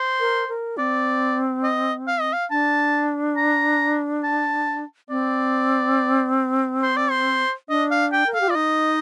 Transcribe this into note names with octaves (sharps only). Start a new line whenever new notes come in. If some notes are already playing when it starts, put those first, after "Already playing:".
Already playing: C5
A#4
A#4
C4 D5
D#5
F5
D#5
F5
D4 A5
A#5
A5
C4 D5
C5
D5
C5
D4 D#5
F5
G5
A#4
A4 F5
G4
F4 D5
D#4 D#5